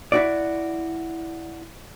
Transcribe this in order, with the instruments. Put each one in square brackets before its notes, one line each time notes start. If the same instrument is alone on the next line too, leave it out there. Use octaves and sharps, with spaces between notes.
[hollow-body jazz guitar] E4 F#4 D5